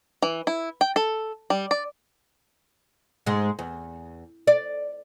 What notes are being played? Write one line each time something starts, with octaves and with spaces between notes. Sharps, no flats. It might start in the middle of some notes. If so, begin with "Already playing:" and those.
E3
E4
G5
A4
G3
D5
G#2 G#3
E2
D5